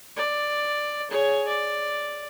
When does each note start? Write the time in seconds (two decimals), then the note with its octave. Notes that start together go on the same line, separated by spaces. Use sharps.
0.16 D5
1.10 G#4 C#5
1.48 D5